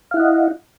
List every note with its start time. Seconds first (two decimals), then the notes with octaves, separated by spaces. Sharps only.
0.11 F5
0.14 E4
0.17 F#5
0.20 D#5